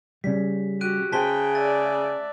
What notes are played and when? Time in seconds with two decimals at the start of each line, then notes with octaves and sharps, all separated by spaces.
0.24 C#3 G3 B6
0.81 F#4 G4 F#6 D7 D#7
1.12 C#3 G#4 C5 G5 A5 B6 G7
1.55 D5 E5 A6